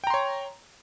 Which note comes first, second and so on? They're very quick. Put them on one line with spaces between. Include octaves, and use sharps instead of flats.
G5 A#5 C6 C#5